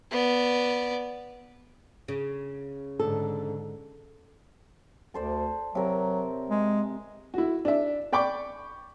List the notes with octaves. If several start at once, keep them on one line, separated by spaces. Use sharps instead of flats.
B3 D5
C#3
G#2 D3 A4
D2 A4 C5 D5
C3 F#3 A#4
G#3
E4 F#4
D4 E5
D5 G5 B5 C#6 D6